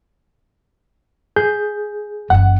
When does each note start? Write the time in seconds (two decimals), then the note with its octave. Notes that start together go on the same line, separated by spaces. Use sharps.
1.36 G#4 G6
2.30 F#1 E3 F#5